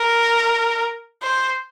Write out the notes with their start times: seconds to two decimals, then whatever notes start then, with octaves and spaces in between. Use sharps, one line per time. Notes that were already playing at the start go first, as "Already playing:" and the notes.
Already playing: A#4
1.23 C5